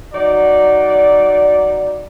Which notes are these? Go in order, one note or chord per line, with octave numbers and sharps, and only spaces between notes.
F#3 D#4 D5